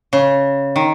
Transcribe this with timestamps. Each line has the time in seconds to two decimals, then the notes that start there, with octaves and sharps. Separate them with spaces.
0.13 C#3
0.76 D#3